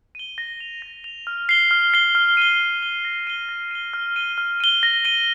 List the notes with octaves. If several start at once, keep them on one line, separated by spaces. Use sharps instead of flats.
D#7 G7
A#6
F7
A#6
F7
F6
C7 G7
F6
C7 G7
F6
D#7 G7
F6
D#7 G7
A#6
D#7 G7
A#6
D#7 G7
F6
D#7 G7
F6
D#7 G7
A#6
D#7 G7